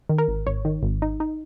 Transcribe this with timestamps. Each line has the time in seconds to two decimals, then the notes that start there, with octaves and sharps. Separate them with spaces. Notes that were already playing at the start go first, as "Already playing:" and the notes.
0.09 D#3
0.18 A#4
0.28 G#1
0.47 G#1 C#5
0.65 D#3
0.83 G#1
1.02 D#4
1.20 D#4